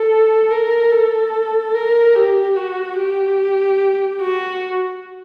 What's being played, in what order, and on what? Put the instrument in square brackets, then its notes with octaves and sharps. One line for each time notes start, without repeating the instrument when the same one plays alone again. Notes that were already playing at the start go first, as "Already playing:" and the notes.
Already playing: [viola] A4
A#4
A4
A#4
G4
F#4
G4
F#4